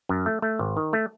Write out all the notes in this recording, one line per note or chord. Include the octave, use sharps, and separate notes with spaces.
F#2
A3
A3
G#1
D#3
A3